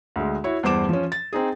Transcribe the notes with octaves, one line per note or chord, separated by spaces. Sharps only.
D2 G#3
E4 F#4 C#5
E2 G2 C5 D6 E7
F3 C#4
A6
C4 D#4 G#4